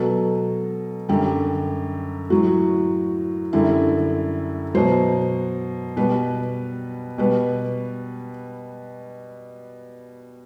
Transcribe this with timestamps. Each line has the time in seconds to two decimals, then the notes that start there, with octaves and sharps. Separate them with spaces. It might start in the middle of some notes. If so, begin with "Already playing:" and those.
Already playing: B2 F#3 A4
1.09 F#2 D3 G3 G4
2.30 A2 F#3 F#4
3.53 F#2 D3 G3 E4
4.74 B2 F#3 C5
5.97 B2 G3 B4
7.18 B2 G3 B4